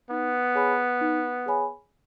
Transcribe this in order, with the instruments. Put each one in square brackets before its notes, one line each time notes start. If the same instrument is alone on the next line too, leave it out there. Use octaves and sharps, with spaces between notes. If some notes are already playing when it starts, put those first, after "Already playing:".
[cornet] B3 [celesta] D#4
[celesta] G#4 C#5 G#5 B5
D#4
G#4 C#5 G#5 B5